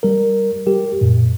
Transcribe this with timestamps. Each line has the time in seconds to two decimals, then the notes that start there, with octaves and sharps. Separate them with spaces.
0.03 G3 A#4
0.67 G3 G4 A#4
1.01 F#2 A#2